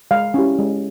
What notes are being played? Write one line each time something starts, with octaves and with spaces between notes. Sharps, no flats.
G#3 F5
C#4 E4 G4
G#3